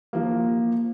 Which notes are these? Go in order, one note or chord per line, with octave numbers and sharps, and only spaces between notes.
F3 A#3